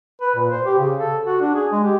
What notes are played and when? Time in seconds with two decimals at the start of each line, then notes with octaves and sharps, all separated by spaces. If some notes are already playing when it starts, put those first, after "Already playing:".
0.22 B4
0.36 A#2
0.51 C5
0.65 G4
0.78 C#3
0.98 A4
1.26 F#4
1.41 D4
1.55 G#4
1.72 G#3
1.84 G4